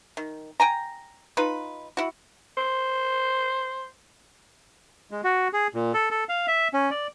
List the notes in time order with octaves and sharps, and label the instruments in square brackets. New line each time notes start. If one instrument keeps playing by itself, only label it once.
[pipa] D#3
G5 G#5 A#5
D#4 F4 B4
E4 F#4
[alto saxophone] C5
[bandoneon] G#3
F#4
G#4
A#2
A4
A4
F5
E5
C#4
D5